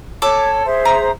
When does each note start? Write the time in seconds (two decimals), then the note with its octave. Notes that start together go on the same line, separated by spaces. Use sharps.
0.22 A4 C#5 D6
0.65 G#4 C5 E5
0.85 A#5